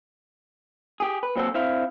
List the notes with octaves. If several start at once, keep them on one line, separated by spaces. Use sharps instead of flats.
G4 G#4
B4
A#2 F#3 C4 F#4 A4
C4 E4 F5